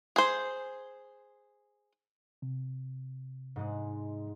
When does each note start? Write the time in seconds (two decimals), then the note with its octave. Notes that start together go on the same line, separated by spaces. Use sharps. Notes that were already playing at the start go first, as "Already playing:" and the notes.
0.16 G#4 C5
2.42 C3
3.56 G#2 G#3